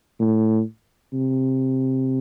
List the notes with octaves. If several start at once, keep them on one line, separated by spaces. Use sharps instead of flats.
A2
C3